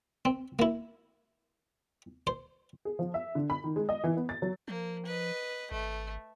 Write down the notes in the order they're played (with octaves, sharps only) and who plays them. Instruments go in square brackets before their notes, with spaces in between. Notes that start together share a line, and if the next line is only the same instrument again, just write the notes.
[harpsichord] C4
A#3 E4
C5
[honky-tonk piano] G#4
F3
E5
D3
B5
D#3
G#3
D#5
E3
B3
A6
F#3
[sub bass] F3 [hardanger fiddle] A#3
[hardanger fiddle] B4 D#5
[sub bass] G#1 [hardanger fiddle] A3